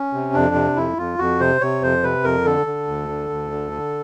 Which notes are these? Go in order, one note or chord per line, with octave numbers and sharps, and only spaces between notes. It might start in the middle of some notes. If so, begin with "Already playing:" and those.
Already playing: C#4
C3
F2 D4
C3
F2 E4
F2 F4
F2 F#4
C3 C5
C3 C#5
F2 C5
C3 B4
F2 A#4
D3 A4
D3
D2
D3
D2
D3
D3